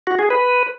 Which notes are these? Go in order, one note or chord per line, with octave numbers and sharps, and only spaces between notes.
F#4
G#4
B4